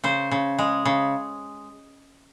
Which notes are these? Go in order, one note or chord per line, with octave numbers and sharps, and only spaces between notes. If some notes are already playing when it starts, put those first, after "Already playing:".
C#3 C5
C#3
G#3
C#3